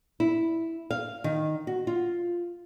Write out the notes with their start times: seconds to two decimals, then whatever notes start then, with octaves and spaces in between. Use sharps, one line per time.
0.20 E4
0.91 F5
1.24 D#3
1.67 F#4
1.87 F4